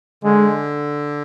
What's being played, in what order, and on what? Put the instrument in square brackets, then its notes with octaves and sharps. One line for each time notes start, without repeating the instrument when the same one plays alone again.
[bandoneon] D3 [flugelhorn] G#3